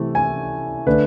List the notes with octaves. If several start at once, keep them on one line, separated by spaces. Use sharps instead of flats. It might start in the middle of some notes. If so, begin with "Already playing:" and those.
Already playing: C3 E3 A3
G#5
D3 A3 D4 B4